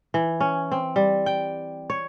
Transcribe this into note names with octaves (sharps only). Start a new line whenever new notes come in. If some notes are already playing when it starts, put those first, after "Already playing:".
E3
C#4
C4
G3
G5
C#5